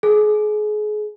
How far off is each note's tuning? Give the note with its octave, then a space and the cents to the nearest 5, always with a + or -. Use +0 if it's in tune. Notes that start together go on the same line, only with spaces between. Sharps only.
G#4 +30